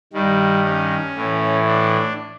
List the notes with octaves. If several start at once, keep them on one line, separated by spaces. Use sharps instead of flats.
G2 D#3 G3
C#4
A2 E3
D4